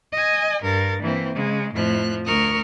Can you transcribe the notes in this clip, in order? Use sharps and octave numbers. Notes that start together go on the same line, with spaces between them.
D#5 G#5
G2 A#4 A6
E3 A#3 C4
C#3 G#3
F2 A2 F3 F#6
D2 A#4 C#6 D#6 F6 F#6